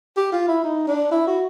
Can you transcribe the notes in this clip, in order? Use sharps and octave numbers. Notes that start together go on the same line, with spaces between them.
G4
F4
E4
D#4
D4
E4
F#4